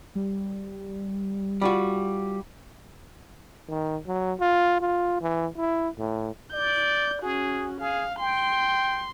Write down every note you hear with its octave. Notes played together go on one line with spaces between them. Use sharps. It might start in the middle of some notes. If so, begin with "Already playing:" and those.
G3
G3 F4 F#4
D#3
F#3
F4
F4
E3
E4
A2
D5 G6
C#4 F#4 G#4
G#4 F5
G5 C6